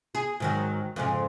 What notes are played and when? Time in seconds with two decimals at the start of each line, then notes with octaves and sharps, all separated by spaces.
0.15 G#4
0.40 G#2 D#3 F#3
0.96 F2 G#2 C#3